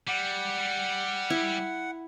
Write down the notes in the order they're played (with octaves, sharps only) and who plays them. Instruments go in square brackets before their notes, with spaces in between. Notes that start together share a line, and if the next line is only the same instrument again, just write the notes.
[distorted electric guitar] G3 [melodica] F#5
[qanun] E4